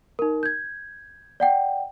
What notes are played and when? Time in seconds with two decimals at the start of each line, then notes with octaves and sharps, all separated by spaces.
0.19 D#4 A#4
0.43 G6 G#6
1.40 D5 F#5 G5